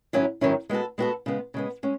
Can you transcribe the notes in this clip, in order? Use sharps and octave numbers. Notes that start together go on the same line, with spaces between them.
G#2 D#3 F#3 C#4 E4
G#2 D#3 F#3 C#4 E4
G#3 B3 F#4 A4
G#3 B3 F#4 A4
C#3 G#3 B3
C#3 G#3 B3
G#3 C#4